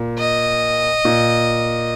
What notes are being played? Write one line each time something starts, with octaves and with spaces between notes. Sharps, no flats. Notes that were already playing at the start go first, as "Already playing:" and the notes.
Already playing: A#2
D#5
A#2